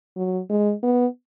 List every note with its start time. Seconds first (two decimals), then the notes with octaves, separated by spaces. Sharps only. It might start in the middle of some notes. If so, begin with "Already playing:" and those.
0.16 F#3
0.50 G#3
0.83 B3